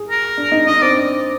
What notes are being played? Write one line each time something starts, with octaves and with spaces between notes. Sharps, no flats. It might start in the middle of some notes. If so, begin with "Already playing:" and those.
Already playing: G#4
A#4
D4
D#4
D4 D#5
C4 D5